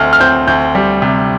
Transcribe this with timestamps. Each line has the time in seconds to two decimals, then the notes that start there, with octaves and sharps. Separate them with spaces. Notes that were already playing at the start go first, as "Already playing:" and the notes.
Already playing: D2 C4 F6
0.13 F6
0.20 C4 G6
0.47 D2 G6
0.75 G3
1.02 C3